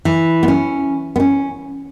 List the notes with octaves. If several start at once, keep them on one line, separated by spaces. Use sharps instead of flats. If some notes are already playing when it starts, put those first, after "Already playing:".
E3
B3
C#4
B3
C#4